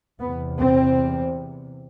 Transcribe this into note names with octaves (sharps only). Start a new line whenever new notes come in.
E2 C3 B3
C4